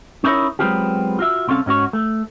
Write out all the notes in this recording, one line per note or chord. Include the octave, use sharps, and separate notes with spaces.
C#4 D#4 E4 A#4 C#5
F#3 G#3 B3 C4 F4 G4
F4 F#4 E5
C2 C4 C#4 A4 F5
G#2 C#4 F#4 C#5
A3